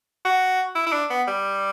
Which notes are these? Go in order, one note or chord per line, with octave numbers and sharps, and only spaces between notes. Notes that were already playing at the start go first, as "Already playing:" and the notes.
F#4
E4
E4
D4
B3
G3